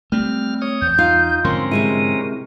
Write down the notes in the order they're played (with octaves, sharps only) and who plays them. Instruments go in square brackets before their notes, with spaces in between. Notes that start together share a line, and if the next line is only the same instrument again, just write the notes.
[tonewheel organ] G3 F6 [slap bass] A3 C4
[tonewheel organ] C#5 D#6
[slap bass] E2 [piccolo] G6
[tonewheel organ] D#4 [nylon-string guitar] F4
[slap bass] G#2 D3 F3 [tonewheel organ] C4 C#4 A#4 [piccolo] C6
[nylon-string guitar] C3 G#3 E4 [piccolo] D#7